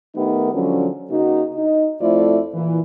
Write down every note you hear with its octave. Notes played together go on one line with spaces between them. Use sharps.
D#3 A3 B3 D#4 G4 A#4
D3 F3 F#3 G#3 C#4
C#3 A#3 D#4 F#4
D#4
F2 A3 E4 F4 C5 D5
A#2 E3